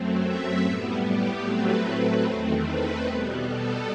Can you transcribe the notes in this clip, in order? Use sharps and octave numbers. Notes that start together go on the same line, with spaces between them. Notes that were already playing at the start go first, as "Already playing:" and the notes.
Already playing: F#2 F#3 A3 C4
E5
A2 G3 B3
G4
A2 F#3 A3 C4 B4
B4
E2 D#3 A3 C4
B4
B2 G3 B3
A4